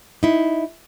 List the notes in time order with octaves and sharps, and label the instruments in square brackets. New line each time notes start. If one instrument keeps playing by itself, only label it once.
[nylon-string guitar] D#4 E4